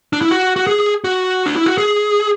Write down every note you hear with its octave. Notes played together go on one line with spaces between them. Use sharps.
D4
E4
F#4
F#4
G#4
F#4
D4
E4
F#4
G#4